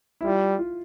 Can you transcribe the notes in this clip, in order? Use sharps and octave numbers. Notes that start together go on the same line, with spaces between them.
E4
G3 F4
F4